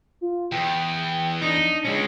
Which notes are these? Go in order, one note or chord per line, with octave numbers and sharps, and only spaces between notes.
F4
E2 G5
D4 D#4
G#3 C#4